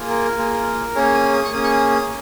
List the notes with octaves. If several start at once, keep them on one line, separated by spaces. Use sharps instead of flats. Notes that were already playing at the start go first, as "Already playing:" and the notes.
Already playing: A#3 F4 G#4
A#4
A#3 F4 G#4
A#3 C#4 G#4 C#5
G#5
D#6
C#6
A#3 C#4 G#4 D#6
C#6
D#6
D#6